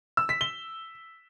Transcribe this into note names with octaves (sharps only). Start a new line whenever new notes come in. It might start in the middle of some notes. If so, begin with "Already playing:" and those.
E6
B6
G7